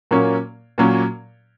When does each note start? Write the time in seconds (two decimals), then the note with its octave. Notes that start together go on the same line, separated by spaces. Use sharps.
0.11 A#2 F#3 A#3 C#4
0.78 A#2 F#3 A#3 C#4